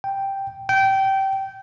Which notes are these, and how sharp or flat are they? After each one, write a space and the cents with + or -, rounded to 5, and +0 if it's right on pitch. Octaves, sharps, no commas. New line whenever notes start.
G5 +0
G5 -20